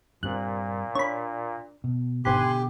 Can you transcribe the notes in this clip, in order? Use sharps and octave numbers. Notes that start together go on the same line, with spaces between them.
G2 A#2 G3 C4 F#6
D4 C#5 B5
B2
G#1 B2 D3 G4 G#5 B5 C6 F#6